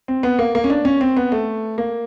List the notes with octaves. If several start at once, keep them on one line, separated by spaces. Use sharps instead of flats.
C4
B3
A#3
A#3
C#4
D4
C#4
C4
B3
A3
A#3